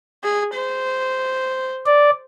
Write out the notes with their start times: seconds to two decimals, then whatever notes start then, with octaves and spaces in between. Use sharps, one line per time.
0.23 G#4
0.54 C5
1.86 D5